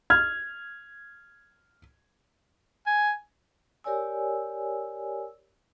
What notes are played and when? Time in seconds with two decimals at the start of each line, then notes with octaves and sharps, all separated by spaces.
0.10 F6 G#6
2.87 G#5
3.84 G4 A#4 C#5 D5 G#5 E6